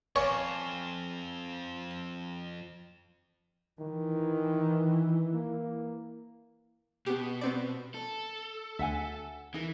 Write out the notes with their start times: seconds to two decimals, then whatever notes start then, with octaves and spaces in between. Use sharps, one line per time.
0.16 F2 C#5 D5 F5 G#5
3.79 D#3 E3
5.33 A#3
7.06 B2 B3 G4
7.41 B3 C4 D5
7.95 A4
8.79 D2 E5 F#5 G#5
9.54 E3 D#4 A#4